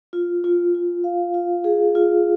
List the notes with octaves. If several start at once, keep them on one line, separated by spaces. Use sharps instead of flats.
F4
F4
F4
F5
F4
G#4
F4